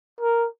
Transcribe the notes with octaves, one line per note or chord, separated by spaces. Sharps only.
A#4